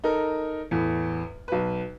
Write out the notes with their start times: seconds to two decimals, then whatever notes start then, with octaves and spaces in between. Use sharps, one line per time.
0.04 D#4 A4 A#4
0.71 E2 A2
1.48 B1 B4